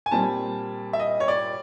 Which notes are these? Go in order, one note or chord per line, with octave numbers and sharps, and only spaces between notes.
G#5
A#2 G3 C4 A5
E5
D#5
C#5
D5